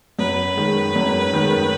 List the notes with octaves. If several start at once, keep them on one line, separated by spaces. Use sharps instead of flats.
F#2 B4
D#3 G#3
F#2
D#3 G#3